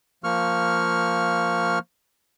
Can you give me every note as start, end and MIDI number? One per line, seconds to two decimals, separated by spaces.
0.24 1.79 53
0.24 1.79 58
0.24 1.79 85
0.24 1.79 89